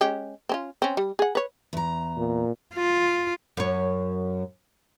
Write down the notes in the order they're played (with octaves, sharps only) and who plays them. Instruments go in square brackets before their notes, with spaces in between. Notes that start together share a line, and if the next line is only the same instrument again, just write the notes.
[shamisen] G#3 C#4 G4
C4 C#4 F4
C4 C#4
G3
G#4 F#5
B4 C#5
[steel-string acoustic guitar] E2 A#5
[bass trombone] A#2
[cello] F4
[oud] F#2 C#5